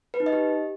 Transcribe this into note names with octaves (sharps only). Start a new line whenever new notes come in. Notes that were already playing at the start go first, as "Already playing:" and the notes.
B4
D#4
D#5
G4